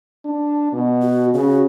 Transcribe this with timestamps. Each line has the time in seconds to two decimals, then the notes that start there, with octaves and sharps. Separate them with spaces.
0.25 D4
0.72 B2
1.02 F#4
1.34 C#3 F#4